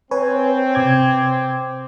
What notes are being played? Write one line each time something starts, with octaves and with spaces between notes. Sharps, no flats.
C4 B4 C#5 G#5
C3 D6 G#6